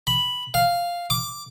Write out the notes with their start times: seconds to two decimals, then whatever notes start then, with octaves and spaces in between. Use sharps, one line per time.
0.07 B5
0.54 F5
1.10 D6